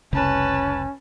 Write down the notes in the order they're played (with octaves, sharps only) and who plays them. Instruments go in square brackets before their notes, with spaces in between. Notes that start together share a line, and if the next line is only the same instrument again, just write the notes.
[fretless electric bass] F1 C2 C#3 [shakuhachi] C#4 [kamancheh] B4 A5